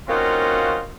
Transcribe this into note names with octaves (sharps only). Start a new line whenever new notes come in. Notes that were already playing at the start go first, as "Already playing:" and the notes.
A#3 C4 C#4 D#4 F4 F#4